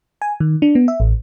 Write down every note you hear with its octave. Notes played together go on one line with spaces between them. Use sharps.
G#5
D#3
D4
B3
E5
A1